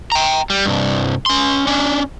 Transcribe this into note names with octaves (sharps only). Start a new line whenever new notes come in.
G5 A#5
G3
C2 G2
C#4 C6
C#4 D4